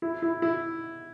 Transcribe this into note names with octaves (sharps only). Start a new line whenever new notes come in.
E4
E4
E4